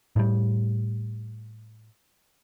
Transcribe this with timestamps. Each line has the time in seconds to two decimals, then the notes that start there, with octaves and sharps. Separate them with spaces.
0.16 A2 G3